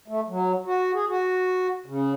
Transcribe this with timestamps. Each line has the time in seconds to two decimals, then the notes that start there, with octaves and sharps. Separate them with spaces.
0.08 A3
0.28 F#3
0.66 F#4
0.94 G#4
1.08 F#4
1.86 C#3